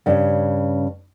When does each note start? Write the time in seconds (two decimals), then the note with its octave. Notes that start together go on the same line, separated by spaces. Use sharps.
0.06 G2 C#3